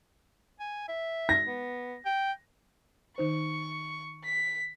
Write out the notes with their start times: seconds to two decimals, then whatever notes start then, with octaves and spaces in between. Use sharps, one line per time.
0.60 G#5
0.88 E5
1.29 A#6
1.47 B3
2.05 G5
3.18 D#3 D#4 C5 C#6
4.25 B6